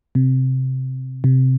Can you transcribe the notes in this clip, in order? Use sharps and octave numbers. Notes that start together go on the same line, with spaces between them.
C3
C3